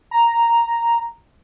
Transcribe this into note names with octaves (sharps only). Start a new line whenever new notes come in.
A#5